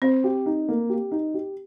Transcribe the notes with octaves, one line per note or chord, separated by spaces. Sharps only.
C4 C5
G4
D#4
A#3
G4
D#4
G4